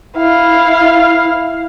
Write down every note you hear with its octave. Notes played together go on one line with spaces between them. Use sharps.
E4 F5